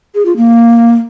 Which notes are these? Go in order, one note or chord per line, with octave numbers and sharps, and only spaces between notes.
G#4
F4
A#3